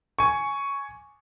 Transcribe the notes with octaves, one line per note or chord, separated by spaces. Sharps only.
G#5 C#6